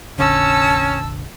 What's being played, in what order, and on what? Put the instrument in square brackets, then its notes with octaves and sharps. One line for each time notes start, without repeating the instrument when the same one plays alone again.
[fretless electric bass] F1 A#1 D3 [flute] C#4 [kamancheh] A5 E6